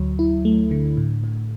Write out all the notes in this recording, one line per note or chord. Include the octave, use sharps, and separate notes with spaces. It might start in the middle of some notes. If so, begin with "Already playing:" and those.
Already playing: D2 F#3
E4
A3
D3
A2
A2